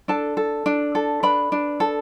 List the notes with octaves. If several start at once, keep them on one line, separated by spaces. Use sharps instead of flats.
D4 A4 A5
A4
D4
A4
D4 B4 B5
D4
A4